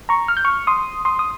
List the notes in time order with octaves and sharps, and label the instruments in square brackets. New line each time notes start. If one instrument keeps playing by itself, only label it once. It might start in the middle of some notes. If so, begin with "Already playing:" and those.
[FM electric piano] A#5 C#6
F6
G6
C#6 F6
C6 D#6
C6 D#6
D#6